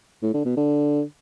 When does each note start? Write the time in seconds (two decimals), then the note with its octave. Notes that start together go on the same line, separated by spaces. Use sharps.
0.23 A2
0.34 D3
0.45 B2
0.57 D3